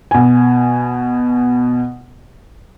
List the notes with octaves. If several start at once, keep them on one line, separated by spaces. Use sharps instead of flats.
B2 G#5